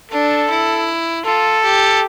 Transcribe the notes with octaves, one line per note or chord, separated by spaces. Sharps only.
D4 A4
E4
F4 A4
G4